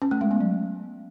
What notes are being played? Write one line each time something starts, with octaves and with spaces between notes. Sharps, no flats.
C#4
A3
G#3
B3
F#3